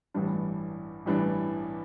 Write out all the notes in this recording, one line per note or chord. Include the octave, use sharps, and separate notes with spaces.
A1 G2 E3 G3 D4
A1 G2 E3 G3 D4